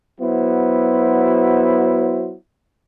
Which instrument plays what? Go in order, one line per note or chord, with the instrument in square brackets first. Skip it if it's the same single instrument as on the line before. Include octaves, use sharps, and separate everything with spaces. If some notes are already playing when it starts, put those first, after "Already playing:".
[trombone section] F#3 B3 E4 F#4 C5